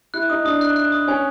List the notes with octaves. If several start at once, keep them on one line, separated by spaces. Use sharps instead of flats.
E4 F#6
D#4 D#6
D4 D#6
F#6
F#6
D#6
C#4 G#5